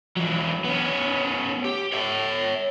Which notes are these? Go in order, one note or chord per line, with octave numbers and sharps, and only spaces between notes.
E3 F#3
B3 C#4
G4
C#5 E5